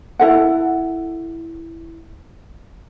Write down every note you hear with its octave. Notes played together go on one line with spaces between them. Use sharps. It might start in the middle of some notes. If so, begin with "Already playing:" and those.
E4 A4 F#5